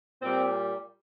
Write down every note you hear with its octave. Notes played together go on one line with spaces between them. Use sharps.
A#2 G3 C4